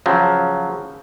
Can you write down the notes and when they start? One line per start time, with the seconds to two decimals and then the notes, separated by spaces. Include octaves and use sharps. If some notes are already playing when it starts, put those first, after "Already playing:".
0.06 C#3 F3 F#3